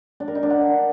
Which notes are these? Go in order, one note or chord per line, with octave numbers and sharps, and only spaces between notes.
D4
A#4
D#4
D4
F#5